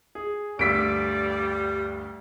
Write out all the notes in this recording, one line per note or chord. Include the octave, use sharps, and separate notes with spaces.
G#4
D2 G2 G3 D5 E6 B6 D7